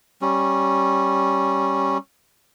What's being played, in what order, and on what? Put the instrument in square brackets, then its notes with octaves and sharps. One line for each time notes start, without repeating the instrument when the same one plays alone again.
[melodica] G3 C#4